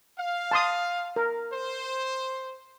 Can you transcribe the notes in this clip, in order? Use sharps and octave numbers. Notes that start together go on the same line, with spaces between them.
F5
A5 C6 D#6
A#4
C5